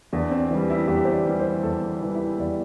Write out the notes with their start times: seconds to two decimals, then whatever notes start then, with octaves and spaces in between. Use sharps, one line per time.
0.13 E2 D4
0.31 C4
0.51 E3 G3
0.70 E4
0.88 E2 G4
1.05 C5
1.14 D5
1.26 E3 G3
1.39 C5
1.63 E2 A4
2.02 E3 G3
2.15 E4
2.39 E2 D5